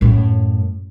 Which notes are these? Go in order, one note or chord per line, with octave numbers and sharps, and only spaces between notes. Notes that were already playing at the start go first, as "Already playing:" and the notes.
F#2 A2